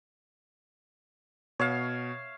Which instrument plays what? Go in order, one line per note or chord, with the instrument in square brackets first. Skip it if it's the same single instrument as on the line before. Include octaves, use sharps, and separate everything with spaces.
[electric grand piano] B2 [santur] C#5 E5 F5